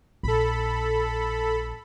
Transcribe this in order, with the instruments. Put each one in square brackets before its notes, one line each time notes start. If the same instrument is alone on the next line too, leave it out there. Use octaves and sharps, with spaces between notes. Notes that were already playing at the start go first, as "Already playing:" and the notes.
[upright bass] A#1 [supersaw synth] A4 B5